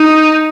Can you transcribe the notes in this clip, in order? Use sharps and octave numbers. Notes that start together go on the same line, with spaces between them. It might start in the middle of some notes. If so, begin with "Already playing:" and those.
Already playing: D#4